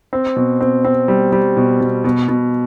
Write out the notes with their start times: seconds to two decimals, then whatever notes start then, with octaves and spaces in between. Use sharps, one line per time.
0.13 C4
0.36 B2
0.61 C4
0.84 C4
1.08 G3
1.32 G3
1.57 B2
1.81 B2
2.04 B2
2.28 B2